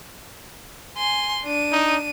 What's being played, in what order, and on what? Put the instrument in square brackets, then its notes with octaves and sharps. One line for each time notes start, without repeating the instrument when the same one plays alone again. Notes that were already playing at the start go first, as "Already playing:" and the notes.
[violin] G#5 C6
D4 D#7
[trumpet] D#4